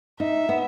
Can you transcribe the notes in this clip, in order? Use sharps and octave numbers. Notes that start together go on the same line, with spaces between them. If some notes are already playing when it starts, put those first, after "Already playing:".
D#4 E5
B3